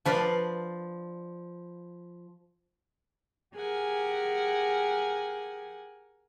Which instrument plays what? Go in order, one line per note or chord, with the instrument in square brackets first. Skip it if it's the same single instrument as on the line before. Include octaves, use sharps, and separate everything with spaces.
[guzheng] F3 B4 D5 F5
[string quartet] G4 G#4 A#4 F#5 G#5